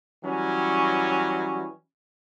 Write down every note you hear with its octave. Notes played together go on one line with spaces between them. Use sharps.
E3 F#3 G3 C#4